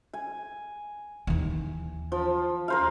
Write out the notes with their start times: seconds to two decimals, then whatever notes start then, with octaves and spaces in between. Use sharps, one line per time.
0.13 G#5
1.27 D#2 E3
2.12 F3
2.68 A#4 C5 F5